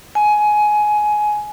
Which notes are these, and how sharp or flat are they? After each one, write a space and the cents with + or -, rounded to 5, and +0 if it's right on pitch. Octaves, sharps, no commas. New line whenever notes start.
G#5 +15